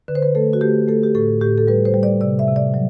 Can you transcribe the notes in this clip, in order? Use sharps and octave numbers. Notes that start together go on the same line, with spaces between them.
D3 B4
C5
B4
A3 A4
F#4
A3 G4
A3 A4
G4
A2 A4
A2 G4
A4
G3 B4
C5
G3
D5
C3 D5
E5
C3
D5
F#3